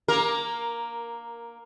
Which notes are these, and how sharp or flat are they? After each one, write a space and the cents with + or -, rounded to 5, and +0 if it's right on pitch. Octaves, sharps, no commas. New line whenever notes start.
A#3 +10 A#4 +0